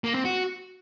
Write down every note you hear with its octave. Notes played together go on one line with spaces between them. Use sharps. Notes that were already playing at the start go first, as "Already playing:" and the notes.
A#3
C4
F#4